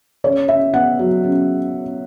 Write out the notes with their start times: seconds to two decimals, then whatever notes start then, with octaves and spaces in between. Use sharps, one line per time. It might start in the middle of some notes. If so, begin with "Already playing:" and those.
0.24 C#3 C#5
0.49 C#3 E5
0.74 B3 F#5
0.99 F#3
1.24 C#3